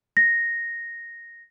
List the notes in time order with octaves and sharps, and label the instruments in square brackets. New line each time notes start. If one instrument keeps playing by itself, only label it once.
[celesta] A#6